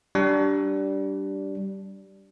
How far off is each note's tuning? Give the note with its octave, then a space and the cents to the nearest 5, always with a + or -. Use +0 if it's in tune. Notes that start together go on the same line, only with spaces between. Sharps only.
G3 -15 D4 -10